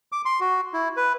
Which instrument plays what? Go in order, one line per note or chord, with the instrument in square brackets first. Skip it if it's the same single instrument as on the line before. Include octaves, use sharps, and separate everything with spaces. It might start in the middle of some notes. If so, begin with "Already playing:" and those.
[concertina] D6
C6
F#4
E4
B4